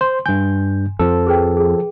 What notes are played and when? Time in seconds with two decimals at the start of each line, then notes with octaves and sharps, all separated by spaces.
0.01 C5 C6
0.26 G2 G#5 G6
0.99 F2 F3 A4
1.27 G#4 B4 G5
1.57 G#4